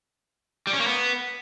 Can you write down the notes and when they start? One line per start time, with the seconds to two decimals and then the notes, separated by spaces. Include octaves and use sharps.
0.67 G3
0.73 C#4
0.80 A#3
0.86 B3